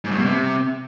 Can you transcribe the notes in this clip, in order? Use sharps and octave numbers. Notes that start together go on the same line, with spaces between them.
G#2
G2
B2
C3